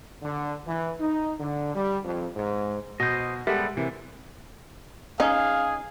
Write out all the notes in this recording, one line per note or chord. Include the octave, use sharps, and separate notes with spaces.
D3
E3
D#4
D3
G3
F2
G#2
B2 F#4 C5 D#5
G3 G#3 B3 G4 A4 A#4 E5 F#5
C3 E3 A#3
C#4 D#4 G#4 F5